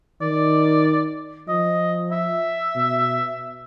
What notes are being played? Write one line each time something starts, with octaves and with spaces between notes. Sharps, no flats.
D#3 D5
F3 D#5
E5
B2